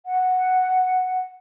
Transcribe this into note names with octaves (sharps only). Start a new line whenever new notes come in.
F#5